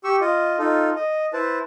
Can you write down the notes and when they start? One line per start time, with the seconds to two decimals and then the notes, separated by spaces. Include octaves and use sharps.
0.04 G4 C#6 E6
0.21 F4 D#5
0.59 D#4 F4 A4
0.96 D#5
1.33 E4 B4 C5 A5